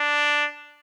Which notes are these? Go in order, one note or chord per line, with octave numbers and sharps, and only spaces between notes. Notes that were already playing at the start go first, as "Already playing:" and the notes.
Already playing: D4